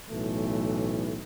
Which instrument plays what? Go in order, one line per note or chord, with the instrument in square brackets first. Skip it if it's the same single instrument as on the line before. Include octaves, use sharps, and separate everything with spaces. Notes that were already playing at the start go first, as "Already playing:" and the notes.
[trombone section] B1 A2 E3 A3